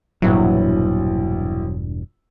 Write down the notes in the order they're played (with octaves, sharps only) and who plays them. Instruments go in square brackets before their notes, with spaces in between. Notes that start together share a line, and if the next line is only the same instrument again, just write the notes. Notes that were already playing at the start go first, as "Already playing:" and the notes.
[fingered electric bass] E1 G2 [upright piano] A#1 E3 E4 [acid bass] F#3